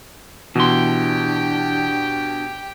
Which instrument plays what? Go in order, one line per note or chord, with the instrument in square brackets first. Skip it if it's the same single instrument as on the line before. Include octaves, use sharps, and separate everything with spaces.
[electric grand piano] B2 [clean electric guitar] E3 C6 [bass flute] D4 [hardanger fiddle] G4 G5